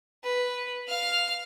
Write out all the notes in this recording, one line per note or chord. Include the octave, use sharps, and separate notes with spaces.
B4
F5 F6